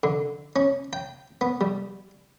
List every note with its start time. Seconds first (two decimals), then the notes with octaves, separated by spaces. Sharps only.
0.03 D3
0.56 C#4
0.93 G5
1.41 B3
1.61 G3